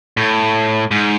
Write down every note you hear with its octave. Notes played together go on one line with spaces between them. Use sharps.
A2
G#2